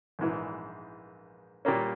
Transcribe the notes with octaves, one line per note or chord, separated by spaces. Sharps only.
A#1 G#2 E3
A#2 G3 A#3 C#4